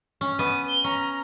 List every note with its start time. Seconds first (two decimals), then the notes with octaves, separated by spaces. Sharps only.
0.21 C#4
0.39 B3 D#7
0.68 G7
0.84 C#4 A#5